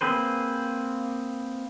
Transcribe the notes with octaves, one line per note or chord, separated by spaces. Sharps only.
A#3 C4 G#4 B4 C5